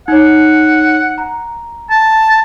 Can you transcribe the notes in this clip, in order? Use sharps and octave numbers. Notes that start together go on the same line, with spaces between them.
D#4 C#5 F#5
A#5
A5